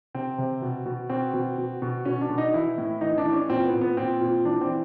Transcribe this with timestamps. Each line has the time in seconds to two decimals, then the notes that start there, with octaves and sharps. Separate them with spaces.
0.14 C3 C4
0.38 C3
0.62 B2
0.86 B2
1.10 B2 C4
1.34 B2
1.58 B2
1.82 B2
2.05 B2 C#4
2.21 D4
2.30 B2
2.38 D#4
2.54 E3 E4
2.78 A2
3.01 E3 D#4
3.18 D4
3.25 E3
3.33 C#4
3.50 A#2 C4
3.65 B3
3.73 A#2
3.81 B3
3.97 A#2 C4
4.21 A#2
4.45 E3 D4
4.61 C4
4.69 E3